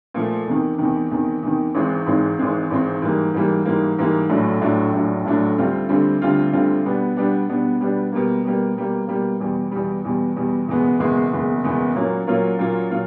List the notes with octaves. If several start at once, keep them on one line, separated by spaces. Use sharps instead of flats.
A#2 F3 A3
E2 C3 D#3
E2 C3 D#3
E2 C3 D#3
E2 C3 D#3
G#1 G#2 E3 G#3 C4
G#1 G#2 E3 G#3 C4
G#1 G#2 E3 G#3 C4
G#1 G#2 E3 G#3 C4
G#2 E3 G3 A#3
G#2 E3 G3 A#3
G#2 E3 G3 A#3
G#2 E3 G3 A#3
A#1 A2 F#3 A3 D4
A#1 A2 F#3 A3 D4
A#1 A2 F#3 A3 D4
A#1 A2 F#3 A3 D4
D2 D3 G3 C4 F4
D2 D3 G3 C4 F4
D2 D3 G3 C4 F4
D2 D3 G3 C4 F4
B2 G3 B3 D4
B2 G3 B3 D4
B2 G3 B3 D4
B2 G3 B3 D4
B2 G3 A#3
B2 G3 A#3
B2 G3 A#3
B2 G3 A#3
E2 B2 G3
E2 B2 G3
E2 B2 G3
E2 B2 G3
F#1 E2 B2 G#3 B3
F#1 E2 B2 G#3 B3
F#1 E2 B2 G#3 B3
F#1 E2 B2 G#3 B3
A#2 F#3 A#3 C#4 F4
A#2 F#3 A#3 C#4 F4
A#2 F#3 A#3 C#4 F4
A#2 F#3 F4